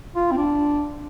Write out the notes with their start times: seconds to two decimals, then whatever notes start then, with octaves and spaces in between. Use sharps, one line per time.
0.16 F4
0.32 C4
0.37 D4